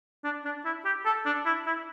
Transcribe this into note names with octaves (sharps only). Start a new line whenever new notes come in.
D4
D4
E4
G4
A4
D4
E4
E4